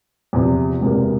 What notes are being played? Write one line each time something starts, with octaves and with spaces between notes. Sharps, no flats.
E2 C3 F3
E1 E2 C3 E3 A#3